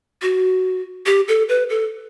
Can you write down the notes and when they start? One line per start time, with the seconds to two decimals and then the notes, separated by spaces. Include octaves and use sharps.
0.22 F#4
1.06 G4
1.28 A4
1.49 B4
1.70 A4